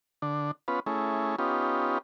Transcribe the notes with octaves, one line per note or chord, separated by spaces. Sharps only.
D3 D4
B3 C#4 F4 B4
A3 C#4 E4 G#4
B3 C#4 D#4 F4 G4